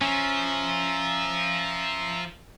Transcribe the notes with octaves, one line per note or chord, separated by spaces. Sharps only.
F3 C#4 E5 A#5